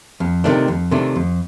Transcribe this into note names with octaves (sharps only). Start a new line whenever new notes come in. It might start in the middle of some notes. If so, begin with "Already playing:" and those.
F2
C3 D#3 A3 D4
F2
C3 D#3 A3 D4
F2